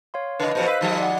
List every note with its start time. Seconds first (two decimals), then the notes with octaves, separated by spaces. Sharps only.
0.14 C#5 F5 C6
0.40 C#3 B4 D#5
0.55 A#2 C#3 F3 C5
0.68 B4 F5 E6 B6
0.81 D#3 F3 G#3
0.98 D5 F#5